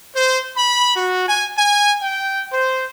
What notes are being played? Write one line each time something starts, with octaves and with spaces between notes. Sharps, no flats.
C5
B5
F#4
G#5
G#5
G5
C5